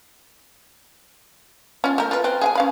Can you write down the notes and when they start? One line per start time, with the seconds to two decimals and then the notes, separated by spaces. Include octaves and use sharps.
1.84 C#4 F4
1.98 A3 A#4
2.11 F4 B4
2.24 C4 B4
2.41 G#4 F5 G#5
2.55 C#4 F5 B5